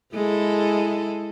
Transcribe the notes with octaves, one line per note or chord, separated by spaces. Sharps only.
G#3 E4 A4